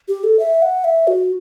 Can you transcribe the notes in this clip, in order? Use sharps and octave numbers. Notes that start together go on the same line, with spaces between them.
G4
A4
E5
F#5
E5
F#4